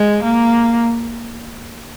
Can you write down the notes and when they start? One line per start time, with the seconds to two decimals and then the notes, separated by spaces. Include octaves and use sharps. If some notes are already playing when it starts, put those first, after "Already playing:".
Already playing: G#3
0.23 A#3